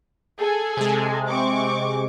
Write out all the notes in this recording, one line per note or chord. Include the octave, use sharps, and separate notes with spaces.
G#4 A4 G#5
C3 G#3
C4 C#6 D6